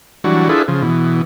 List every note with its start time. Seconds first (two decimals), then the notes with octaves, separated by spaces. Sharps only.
0.24 E3 F#3 G3 D4 F#4
0.49 D4 E4 F4 G#4 A4 B4
0.68 C#3 F3
0.83 B2 E3